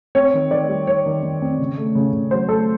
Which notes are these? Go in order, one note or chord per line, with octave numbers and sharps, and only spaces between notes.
C4 C#5
D#3
D#3 D5
G3
D#3 C#5
D#3
D#3
C4
C#3
A3
C#3
C#3
F#3 C5
A3 A4